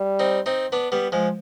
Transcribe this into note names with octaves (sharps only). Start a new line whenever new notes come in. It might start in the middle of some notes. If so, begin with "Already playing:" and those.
Already playing: G3
C4 D#4
C4 D#4
B3 D4
G3 B3
F3 G#3